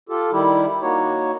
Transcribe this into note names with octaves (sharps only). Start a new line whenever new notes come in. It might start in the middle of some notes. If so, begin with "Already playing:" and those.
F4 G4 A4
D#3 G3 E4 G4
A#3 D#4 F#4 C#5